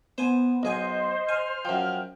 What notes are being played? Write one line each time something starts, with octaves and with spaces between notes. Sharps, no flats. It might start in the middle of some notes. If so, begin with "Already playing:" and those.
B3 C5 G#5
B1 G#4 C5 D#5 G#5
G#5 F6
F#2 F3 G5